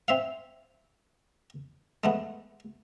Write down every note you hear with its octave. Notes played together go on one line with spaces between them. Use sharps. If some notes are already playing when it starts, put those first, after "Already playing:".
C4 E5 F5
G#3 A3 B3